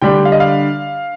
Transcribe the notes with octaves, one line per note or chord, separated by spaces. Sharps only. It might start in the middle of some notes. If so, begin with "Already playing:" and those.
D3 G3 D4 G5
F5
D#5
F5